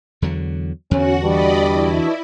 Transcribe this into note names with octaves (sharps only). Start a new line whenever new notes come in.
E2 D3 F#3
E2 D3 C#4 F#4 F#5
E3 G3 D4 F#4 D5 D#5 B5
E4